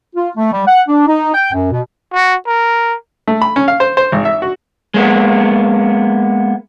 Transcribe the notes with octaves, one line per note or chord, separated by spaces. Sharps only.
F4
A3
G3
F#5
D4
D#4
G5
F#2
B2
F#4
A#4
A3
B5
C#4
F5
C5
C5
G#1
E5
F#4
G#3 A#3 B3